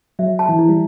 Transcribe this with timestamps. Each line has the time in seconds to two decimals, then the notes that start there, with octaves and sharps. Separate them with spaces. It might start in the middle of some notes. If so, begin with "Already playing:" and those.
0.19 F#3 E5
0.39 A5
0.49 E3
0.59 E4
0.69 G3